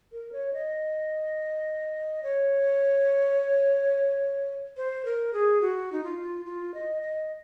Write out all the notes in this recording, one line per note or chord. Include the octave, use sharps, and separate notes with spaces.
A#4
C#5
D#5
C#5
C5
A#4
G#4
F#4
D#4
F4
F4
D#5
D#5